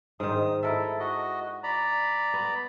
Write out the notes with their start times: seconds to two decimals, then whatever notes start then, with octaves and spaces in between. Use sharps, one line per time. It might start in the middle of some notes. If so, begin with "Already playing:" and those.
0.20 G#2 D#3 D#6
0.63 E4 A4 A#4 E5
1.00 F#4 D#5
1.63 D5 A#5 B5
2.34 B3